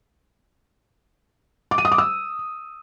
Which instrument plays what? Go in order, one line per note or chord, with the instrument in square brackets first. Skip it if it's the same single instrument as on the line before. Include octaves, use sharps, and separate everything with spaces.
[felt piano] D6
D#7
D#6
D6
E6